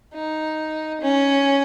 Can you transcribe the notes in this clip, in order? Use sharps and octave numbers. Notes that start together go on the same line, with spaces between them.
D#4
C#4